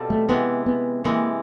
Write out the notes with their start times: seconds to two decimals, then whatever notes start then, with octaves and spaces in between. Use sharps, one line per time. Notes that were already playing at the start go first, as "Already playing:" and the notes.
Already playing: B2 G3 C4 F4 A4
0.10 A3
0.29 C3 E3 G#3 B3
0.66 B3
1.04 C3 E3 G#3 A#3